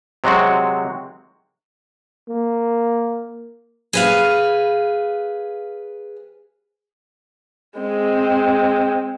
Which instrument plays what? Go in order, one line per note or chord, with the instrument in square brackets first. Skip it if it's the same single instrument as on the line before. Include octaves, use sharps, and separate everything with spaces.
[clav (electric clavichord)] C3 F#3 G#3 C4 F#4
[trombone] A#3
[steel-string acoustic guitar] G#4 B4 F5
[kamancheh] G#3 C4